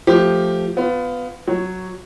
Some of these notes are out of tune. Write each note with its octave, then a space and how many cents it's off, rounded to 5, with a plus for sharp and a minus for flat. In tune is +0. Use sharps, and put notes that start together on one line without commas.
F3 +0 A3 +0 G4 +0
B3 +20 F4 +0
F#3 +0 C#5 +0